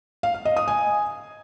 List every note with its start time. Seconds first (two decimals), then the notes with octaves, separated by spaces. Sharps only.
0.23 F5
0.34 F5
0.45 D#5
0.57 D#6
0.68 G#5